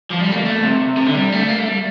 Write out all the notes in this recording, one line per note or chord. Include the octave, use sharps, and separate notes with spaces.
F3
G3
A3
A#3
A3
C3
C3
D3
G3
A3
A#3
A3
G3